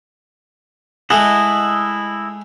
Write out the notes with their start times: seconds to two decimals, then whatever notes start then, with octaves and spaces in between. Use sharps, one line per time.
1.10 G#3 A3 E4 D#5 F#5